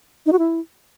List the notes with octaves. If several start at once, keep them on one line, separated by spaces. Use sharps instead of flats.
D#4
F#4
E4